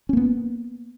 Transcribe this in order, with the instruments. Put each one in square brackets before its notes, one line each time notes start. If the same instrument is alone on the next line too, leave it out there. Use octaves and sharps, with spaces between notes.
[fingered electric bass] C#4
A#3
B3